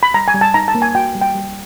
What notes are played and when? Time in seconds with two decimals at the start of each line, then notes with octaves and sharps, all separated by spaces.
0.03 B5
0.14 G3 A#5
0.28 G#5
0.34 G3
0.41 A5
0.54 D#4 A#5
0.68 A5
0.75 A#3
0.82 G#5
0.95 F#4 G5
1.15 G3
1.22 G5
1.35 G3